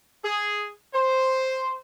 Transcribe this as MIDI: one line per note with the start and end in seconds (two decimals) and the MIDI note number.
0.24 0.67 68
0.94 1.74 72